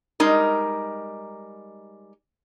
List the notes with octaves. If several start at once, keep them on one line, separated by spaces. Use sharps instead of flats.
G3 G#3 D#4 A#4